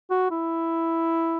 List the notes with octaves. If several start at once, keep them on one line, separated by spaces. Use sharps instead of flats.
F#4
E4